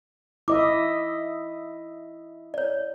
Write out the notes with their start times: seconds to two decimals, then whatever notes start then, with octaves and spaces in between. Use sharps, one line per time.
0.48 E4 D#5 E5 D6
2.54 C#5 D5